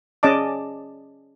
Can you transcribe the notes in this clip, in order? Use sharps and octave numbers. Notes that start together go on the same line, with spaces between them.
C#4 G#4 D5 D#5 A5 D6